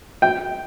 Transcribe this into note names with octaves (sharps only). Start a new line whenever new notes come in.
G5